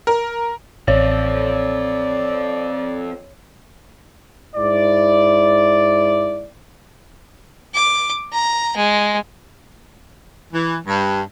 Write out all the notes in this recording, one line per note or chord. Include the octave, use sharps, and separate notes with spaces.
A#4
A1 F3 C4 C#5 D5
G#2 E4 D5
D6
A#5
G#3
E3
G2